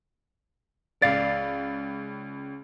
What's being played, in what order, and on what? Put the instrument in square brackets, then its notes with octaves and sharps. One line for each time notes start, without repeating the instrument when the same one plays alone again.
[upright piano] C#2 A6 [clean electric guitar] D5 F5